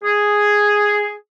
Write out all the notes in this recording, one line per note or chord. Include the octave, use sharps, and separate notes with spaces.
G#4